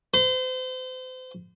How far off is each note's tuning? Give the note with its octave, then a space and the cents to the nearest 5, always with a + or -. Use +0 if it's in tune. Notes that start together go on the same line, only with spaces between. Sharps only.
C5 -35